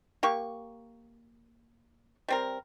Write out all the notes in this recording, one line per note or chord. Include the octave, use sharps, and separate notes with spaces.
A#3 G4 C#6
G3 C4 A#4